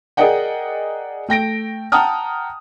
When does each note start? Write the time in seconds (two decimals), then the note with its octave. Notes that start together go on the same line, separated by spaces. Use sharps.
0.17 G#4 A#4 D5 D#5 F#5 G5
1.28 A3 G5 A#6 D7
1.92 F#5 G5 A5 A#5 D#6 F6